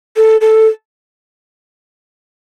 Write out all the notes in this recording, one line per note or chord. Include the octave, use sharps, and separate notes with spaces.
A4
A4